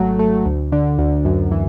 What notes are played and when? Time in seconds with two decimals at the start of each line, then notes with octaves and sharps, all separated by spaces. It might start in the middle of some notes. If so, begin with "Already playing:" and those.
Already playing: G#1 F#3 A3
0.19 A3
0.45 D2
0.72 D3
0.98 D2
1.25 F#2
1.51 E3